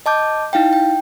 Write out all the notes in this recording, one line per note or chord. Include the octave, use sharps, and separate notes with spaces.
D#5 A5 D6 G6
D#4 E4 F5 G5
G5